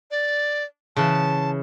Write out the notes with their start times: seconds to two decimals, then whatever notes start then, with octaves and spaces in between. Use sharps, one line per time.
0.11 D5
0.96 C#3 E3 A5